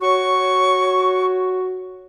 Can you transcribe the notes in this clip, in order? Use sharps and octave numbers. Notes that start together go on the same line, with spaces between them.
F#4 C#5 C#6